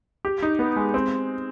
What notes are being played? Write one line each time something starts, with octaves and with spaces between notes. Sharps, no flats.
G4
D#4
B3
G#3
C4